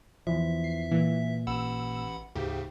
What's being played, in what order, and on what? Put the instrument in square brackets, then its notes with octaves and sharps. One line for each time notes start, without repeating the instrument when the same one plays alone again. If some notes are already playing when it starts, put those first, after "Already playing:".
[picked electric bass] E2 E3 F3 [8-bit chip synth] E5
[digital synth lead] C7
[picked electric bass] A#2 [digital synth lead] E3
[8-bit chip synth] A1 F#5 B5 [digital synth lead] E6
[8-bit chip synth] D2 G#2 C#3 [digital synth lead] G4